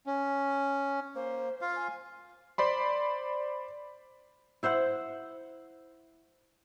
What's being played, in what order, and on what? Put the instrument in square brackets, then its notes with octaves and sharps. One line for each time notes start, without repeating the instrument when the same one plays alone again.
[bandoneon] C#4
[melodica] A#3 [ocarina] C5
[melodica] F4 F5
[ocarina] G#5
[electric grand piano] C5 D5 B5 C6
[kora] E4 C5 E5 F#5